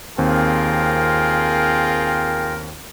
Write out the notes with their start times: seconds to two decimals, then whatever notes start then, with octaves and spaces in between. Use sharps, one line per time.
0.18 D#2 C4 F4 G#4 A#4 G5